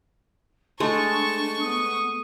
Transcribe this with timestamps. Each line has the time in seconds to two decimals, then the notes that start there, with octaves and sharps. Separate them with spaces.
0.80 G#3 A3 D4 A5 C#6
1.62 B3 D#6